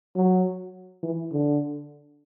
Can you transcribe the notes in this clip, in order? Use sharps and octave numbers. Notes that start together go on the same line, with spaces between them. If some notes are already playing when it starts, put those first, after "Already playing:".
F#3
E3
D3